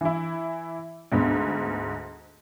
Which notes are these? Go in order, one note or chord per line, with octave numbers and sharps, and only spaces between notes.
E3 E4
D2 G#2 B3